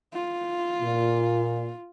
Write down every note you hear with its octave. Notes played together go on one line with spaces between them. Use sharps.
F4
A#2